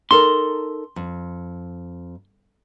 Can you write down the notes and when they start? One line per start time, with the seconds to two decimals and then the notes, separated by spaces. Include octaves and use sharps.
0.11 D#4 A4 A#4 C6
0.96 F2